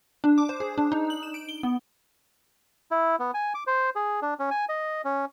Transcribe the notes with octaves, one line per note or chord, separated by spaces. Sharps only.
D4
D6
C5
G#4
D4
D#4
F#7
E7
D7
G7
B3
E4
B3
G#5
D6
C5
G#4
D4
C#4
G#5
D#5
C#4